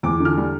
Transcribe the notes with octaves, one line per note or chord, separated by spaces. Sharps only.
E2 D6
D3
F6
G3